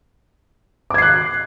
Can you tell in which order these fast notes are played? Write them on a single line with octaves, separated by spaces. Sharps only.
D6 G#6 C7 F#6